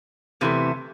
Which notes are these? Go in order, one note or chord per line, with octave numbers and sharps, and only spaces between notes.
E2 C3 E3 A3